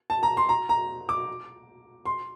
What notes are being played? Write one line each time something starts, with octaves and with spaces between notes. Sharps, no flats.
A5
A#5
C6
A#5
A#5
D6
C6